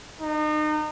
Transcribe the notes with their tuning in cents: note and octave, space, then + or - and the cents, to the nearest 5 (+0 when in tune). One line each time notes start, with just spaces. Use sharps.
D#4 -35